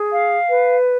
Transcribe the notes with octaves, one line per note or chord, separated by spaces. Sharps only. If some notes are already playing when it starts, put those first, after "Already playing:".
Already playing: G#4
F5
B4